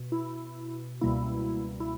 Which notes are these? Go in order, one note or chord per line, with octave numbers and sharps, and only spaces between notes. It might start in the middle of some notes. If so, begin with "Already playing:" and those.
Already playing: B2
E4
C#2 B2 G3 A#3 E4
E4